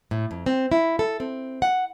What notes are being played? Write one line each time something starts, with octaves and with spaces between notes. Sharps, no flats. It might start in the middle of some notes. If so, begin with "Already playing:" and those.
A2
F2
C4
E4
A4
C4
F#5